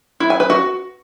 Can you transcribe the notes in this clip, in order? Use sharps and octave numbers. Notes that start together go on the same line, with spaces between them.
E4
G#5
B4
F#4